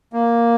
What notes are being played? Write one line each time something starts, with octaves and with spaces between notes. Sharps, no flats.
A#3